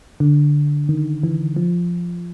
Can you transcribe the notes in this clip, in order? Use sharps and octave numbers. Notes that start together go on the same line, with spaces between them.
D3
D#3
E3
F3